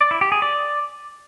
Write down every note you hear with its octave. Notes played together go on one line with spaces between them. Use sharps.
D5
E4
G4
G#4
D5